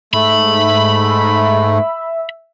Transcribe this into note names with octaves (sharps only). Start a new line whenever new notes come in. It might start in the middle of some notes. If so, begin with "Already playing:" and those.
G#2 A3 E5 B5